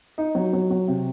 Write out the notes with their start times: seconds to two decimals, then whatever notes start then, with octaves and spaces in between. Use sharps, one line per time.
0.18 D#4
0.35 F#3
0.53 F#3
0.70 F#3
0.88 C3